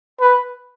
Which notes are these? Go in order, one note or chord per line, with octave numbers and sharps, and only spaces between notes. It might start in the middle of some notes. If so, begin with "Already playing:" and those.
B4